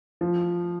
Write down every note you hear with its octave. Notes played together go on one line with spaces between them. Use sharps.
F3